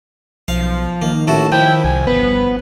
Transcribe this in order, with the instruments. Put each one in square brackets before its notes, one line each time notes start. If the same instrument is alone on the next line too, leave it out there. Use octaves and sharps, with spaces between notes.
[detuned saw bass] B1 [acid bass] F3 [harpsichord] F5
[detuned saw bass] D#3 [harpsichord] A#3
[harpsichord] A1 E4 F#4 [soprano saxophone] A5
[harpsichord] F3 [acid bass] E4 [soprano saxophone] G5
[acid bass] C2 [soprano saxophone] G#5
[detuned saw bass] G1 [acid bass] B3 [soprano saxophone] B4